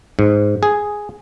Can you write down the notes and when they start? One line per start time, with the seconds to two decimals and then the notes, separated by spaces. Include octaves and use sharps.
0.19 G#2
0.63 G#4